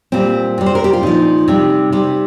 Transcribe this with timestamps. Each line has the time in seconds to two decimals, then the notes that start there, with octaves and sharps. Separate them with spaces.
0.12 A#2 G3 C4
0.58 C3 G3
0.66 C5
0.75 A#4
0.84 G4
0.93 F4
1.03 A#2 F3 D#4
1.48 C3 G3
1.92 C3 G3